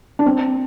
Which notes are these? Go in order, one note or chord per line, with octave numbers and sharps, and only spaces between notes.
D4
C4